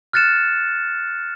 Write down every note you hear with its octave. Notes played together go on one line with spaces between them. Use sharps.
F6 F#6 A6 C#7 E7